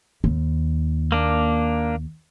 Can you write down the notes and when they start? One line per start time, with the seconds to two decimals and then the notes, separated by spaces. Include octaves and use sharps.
0.24 D#2
1.12 A#3 D4